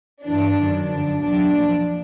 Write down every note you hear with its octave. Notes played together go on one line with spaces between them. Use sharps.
G2 E3 D4
F#2 D#3 F#3
F#2 D3 F3 D4
E2 B2 F#3 D4
A#2 F3